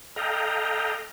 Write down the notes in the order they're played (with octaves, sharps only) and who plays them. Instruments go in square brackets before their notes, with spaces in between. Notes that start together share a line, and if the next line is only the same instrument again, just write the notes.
[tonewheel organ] A4 D#5 F5 G5 A#5